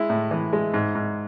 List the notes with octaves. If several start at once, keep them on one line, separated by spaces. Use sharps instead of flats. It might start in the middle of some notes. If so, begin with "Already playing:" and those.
Already playing: G#3 E4
A2
E3
G#3
G#2
G#2